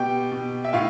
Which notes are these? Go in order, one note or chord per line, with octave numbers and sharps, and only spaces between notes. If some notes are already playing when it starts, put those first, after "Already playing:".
Already playing: B2 G4 G5
B2
E5
A2 F4 F5